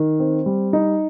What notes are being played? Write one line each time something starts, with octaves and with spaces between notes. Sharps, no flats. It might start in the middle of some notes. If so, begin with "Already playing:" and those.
Already playing: D#3
C4
G3
D#4